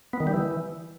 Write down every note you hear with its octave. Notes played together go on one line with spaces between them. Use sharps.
B3
D#3
G3
E3